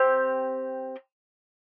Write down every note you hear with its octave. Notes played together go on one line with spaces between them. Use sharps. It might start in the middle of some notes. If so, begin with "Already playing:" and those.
Already playing: C4 G4